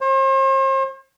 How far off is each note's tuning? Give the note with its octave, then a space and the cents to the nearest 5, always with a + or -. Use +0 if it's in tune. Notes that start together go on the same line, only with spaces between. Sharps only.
C5 +40